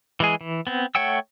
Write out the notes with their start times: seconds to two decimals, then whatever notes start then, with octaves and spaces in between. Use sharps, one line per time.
0.20 E3 G#3 G#4
0.41 E3
0.67 B3 C4
0.95 A3 C#5 F#5 G5 E6